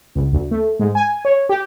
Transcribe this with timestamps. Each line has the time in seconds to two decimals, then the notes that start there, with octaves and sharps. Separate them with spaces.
0.15 C#2
0.33 D2
0.51 A3
0.79 G#2
0.95 G#5
1.25 C#5
1.49 G4